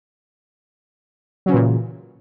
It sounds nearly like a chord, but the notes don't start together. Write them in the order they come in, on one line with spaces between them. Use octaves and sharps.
F#3 C#3 E3 A#2